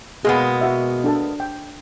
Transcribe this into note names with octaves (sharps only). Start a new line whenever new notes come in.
B2 G#3 A#3 B3 G#4
F#4 E5
D4 A4 A5
G5